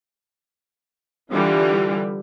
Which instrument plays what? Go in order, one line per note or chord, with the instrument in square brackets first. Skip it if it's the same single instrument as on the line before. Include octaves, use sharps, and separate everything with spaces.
[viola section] D3 E3 G3 F4